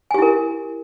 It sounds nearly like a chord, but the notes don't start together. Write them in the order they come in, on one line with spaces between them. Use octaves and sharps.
G#5 G4 E4 A#4